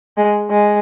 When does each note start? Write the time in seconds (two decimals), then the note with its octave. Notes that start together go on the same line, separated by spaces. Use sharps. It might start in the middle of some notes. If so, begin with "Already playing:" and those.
0.17 G#3
0.51 G#3